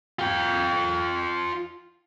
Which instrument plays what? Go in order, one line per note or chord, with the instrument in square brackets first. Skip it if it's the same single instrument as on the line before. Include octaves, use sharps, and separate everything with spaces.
[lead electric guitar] F4 G5